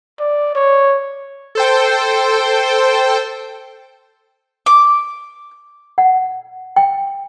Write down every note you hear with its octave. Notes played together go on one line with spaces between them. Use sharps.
D5
C#5
A4 C5 G5
D6
F#5
G5